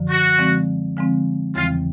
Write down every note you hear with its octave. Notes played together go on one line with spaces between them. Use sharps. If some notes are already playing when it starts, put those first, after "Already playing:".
Already playing: F#2 D3 F3
F#4
D3 F3 G#3 C4
D3 F3 G#3 C4
E2 C#3 E3 G3 C4 F4